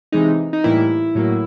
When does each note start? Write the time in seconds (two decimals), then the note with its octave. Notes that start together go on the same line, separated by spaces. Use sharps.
0.12 C3 E3 G#3 D#4
0.53 D#4
0.64 A2 E3 G3 A#3 E4
1.15 A2 F#3 A#3